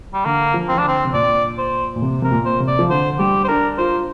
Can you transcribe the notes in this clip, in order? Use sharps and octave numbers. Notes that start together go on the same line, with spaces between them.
G3
D3 A#3
F3
C4
F3 D4
D3 C4
C3
A#2 D5
C5
A#2
C3
C3 A#4
A#2
C5
C3
D5
F3
D3 C5
G3 G4
C5
D4 A#4
F4 C5